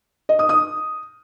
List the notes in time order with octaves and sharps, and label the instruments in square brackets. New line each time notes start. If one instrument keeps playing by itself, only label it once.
[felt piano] D#5
D#6
D#6